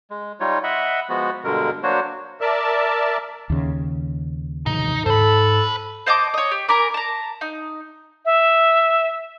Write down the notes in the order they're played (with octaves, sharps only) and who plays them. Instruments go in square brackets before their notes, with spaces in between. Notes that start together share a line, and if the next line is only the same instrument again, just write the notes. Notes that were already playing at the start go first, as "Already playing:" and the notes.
[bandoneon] G#3
G3 D#4 F4 C#5
D#5 E5 F#5 B5
F3 G#3 B3 F#4
G2 B2 D3 G#3 A#4
F#3 A#3 D4 F#4 C5 C#5
[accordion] A#4 D5 E5 A5
[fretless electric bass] D#2 C#3
[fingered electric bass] A2 C3 E3 [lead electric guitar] D#4
[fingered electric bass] G#2 [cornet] A4 [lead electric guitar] C5 B5
[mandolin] C5 D#5 A5 D6
C#5 D#5
G4
A#4 G#5 B5 D6
A5 A#5
D#4
[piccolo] E5